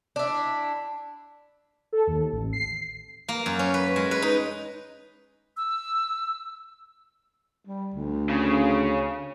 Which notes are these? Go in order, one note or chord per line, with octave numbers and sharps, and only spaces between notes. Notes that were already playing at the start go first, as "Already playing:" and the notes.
D4 E4
A4
D#2
A1
C7
A#3
F#2
C#4
B4
G#3
B4
D#4
E6
G3
D2
C#3